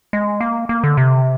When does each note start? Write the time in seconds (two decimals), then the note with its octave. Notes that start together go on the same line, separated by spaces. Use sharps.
0.13 G#3
0.41 A#3
0.69 A#3
0.84 D3
0.97 C3